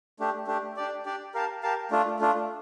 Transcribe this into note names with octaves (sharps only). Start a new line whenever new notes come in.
A3 D4 G4
A3 D4 G4
D4 G4 D5
D4 G4 D5
G4 A#4 F5 A5
G4 A#4 F5 A5
A3 D4 F4
A3 D4 F4